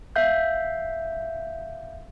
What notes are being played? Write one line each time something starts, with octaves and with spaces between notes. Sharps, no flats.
E5 F5 G6